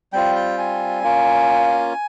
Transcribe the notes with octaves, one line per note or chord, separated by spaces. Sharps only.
G3 C4 F4 G5
G5
G#5
A#3 C#4 F4